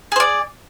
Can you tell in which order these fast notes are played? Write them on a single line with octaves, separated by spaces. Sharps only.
G#4 C5 D5